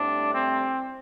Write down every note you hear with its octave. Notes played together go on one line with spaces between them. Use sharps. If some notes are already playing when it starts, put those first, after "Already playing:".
Already playing: A2 G3 C4 D4
C4